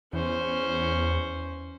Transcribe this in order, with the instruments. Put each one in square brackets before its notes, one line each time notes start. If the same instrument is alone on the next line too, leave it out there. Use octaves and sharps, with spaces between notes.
[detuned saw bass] E2 [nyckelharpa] C#4 C5